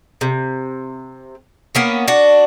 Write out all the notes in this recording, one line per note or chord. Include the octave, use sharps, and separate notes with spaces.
C3
A#3 B3 C#4
D4 F#4